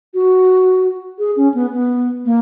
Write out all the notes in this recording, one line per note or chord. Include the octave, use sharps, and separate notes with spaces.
F#4
G#4
C#4
B3
B3
A#3